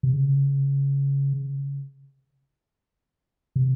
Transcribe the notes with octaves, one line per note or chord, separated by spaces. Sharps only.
C3
C#3
C3